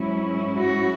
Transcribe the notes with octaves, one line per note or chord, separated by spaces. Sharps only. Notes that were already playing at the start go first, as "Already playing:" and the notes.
Already playing: G#2 F#3 C#4 E4
F#4